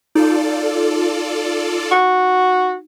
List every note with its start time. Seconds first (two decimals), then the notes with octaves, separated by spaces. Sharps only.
0.15 D#4 F4 A4 D5
1.91 F#4